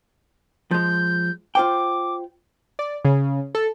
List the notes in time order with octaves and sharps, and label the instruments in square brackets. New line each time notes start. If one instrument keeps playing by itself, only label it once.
[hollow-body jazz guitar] F3 G#3 [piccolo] G6
[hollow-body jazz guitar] F4 C5 G5 [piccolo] D6
[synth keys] D5
C#3
A4